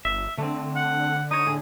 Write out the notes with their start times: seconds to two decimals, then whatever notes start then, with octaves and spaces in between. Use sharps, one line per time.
0.05 G1 E5
0.38 D3 A3 C4
0.76 F#5
1.31 D#4 C#5 D#6
1.46 A2 G#4